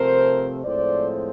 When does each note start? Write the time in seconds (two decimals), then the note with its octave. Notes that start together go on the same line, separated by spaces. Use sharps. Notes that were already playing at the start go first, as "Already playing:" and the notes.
Already playing: C3 F3 A3 C4 A#4 C5
0.64 A2 F3 G#3 C4 C5 D5